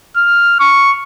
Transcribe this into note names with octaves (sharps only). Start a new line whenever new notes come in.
F6
C#6